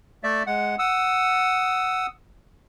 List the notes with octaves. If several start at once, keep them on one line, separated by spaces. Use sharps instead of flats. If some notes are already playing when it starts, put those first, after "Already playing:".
A3 D5 E5
G#3 F#5
F#5 D#6 E6